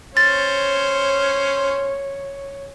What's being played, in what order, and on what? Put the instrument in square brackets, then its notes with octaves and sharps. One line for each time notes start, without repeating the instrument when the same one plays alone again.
[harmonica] C#4 C5 [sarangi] C#5 [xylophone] A6